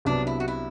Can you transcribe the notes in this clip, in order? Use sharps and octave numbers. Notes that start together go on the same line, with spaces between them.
C2 C3 F#3 B3 D4
E4
F#4
E4